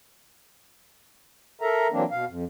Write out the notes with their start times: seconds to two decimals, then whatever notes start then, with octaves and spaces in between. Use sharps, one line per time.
1.61 A4 A#4 E5 A#5
1.92 E3 F#3 A#3 C4 D4
2.11 B2 F5
2.27 F2